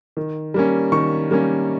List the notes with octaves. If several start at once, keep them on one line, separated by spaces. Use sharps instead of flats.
D#3
G3 A#3 C#4
D#3 C#6
G3 A#3 C#4